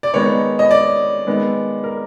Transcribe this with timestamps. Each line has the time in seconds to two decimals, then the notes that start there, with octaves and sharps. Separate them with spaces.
0.03 D5
0.14 D#3 G#3 B3 D#4 C#5
0.59 D#5
0.71 D5
1.27 D#3 G#3 B3
1.84 A#4